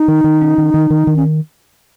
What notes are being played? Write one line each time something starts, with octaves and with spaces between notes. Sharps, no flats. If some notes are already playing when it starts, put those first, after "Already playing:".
Already playing: D#4
D#3
D#3
C#4
D#3
D#3
D#3
D#3
C#4